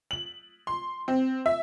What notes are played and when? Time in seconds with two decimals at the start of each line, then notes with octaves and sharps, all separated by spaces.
0.11 F#7
0.67 C6
1.08 C4
1.46 E5